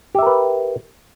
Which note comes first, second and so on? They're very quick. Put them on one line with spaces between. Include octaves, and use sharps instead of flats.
G4 E5 A#4 B4